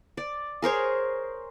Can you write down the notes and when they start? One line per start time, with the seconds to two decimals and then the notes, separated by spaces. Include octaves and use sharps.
0.17 D5
0.62 G#4 A#4 C5 C#5